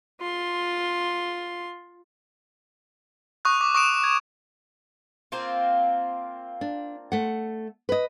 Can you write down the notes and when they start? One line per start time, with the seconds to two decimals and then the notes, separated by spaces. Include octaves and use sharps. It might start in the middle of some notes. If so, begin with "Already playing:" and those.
0.20 F4 C6
3.45 C#6 D#6 F#6
3.61 C#6 D6
3.75 C#6 D#6 D7 E7
4.04 G#6
5.32 A#3 C4 F4
6.61 D4
7.12 A3 F#5
7.89 B4 D#5